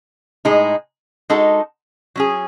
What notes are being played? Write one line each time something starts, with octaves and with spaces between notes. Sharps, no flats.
A2 G#3 D#4
G#3 D#4 F#4 A4
F#3 C#4 G#4